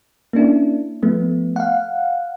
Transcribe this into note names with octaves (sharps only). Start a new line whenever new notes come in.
A#3 C#4 D4 E4
F3 A3 B3
F5 F#5